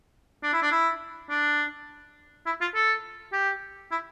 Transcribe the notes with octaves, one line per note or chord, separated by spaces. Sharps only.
D4
E4
D4
E4
D4
E4
F4
A4
G4
E4